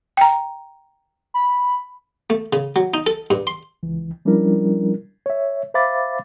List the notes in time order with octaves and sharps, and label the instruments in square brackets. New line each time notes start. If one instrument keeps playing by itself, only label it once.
[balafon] G5 A#5
[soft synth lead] B5
[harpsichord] A3
C#3
F#3
D#4
A4
G2
C6
[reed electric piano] C#2 E3
F3 G3 C#4 D4 E4 A#4
C#5 E5
C5 E5 F5 B5 D6 A6